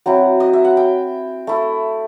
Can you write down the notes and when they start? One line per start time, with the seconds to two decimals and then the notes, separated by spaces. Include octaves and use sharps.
0.06 F#3 C4 E4 F#5
0.40 D#5
0.53 E5
0.64 F#5
0.77 G5
1.47 A3 E4